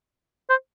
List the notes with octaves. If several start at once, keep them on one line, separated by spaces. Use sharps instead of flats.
C5